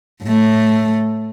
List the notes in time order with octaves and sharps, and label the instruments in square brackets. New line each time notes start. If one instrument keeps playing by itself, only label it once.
[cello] A2 A3